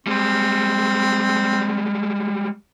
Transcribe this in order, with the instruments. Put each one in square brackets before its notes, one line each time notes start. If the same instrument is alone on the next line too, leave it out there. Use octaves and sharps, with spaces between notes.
[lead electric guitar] G3 G#3 [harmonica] C4